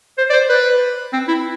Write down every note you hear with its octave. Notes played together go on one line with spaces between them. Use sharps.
C5
D5
C5
B4
C4
E4